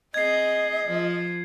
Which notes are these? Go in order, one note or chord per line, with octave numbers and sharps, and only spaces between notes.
C4 G#4 D#5 G#6 C7
F3